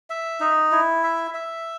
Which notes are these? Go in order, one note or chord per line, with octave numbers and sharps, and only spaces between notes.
E5
D#4
E4
E5
E5